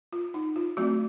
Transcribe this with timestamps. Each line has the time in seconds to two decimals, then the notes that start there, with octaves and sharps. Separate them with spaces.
0.13 F4
0.34 D#4
0.56 F4
0.77 F#3 A3 C4 F#4